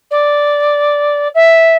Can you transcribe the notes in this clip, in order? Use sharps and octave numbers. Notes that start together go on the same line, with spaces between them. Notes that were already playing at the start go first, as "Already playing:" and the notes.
D5
E5